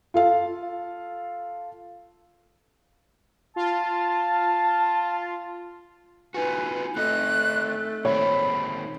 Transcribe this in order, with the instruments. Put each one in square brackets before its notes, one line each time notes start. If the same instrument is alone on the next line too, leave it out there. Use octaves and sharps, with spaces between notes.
[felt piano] F4 A4 F5
[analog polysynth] F4 [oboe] A5
[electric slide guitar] D#4 F4 F#4 [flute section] B4 G#5
[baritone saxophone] A3 [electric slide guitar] C4 D#4 D#5 [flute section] F#6
[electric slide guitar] A#2 D#3 C4 [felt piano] C#5 [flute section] B5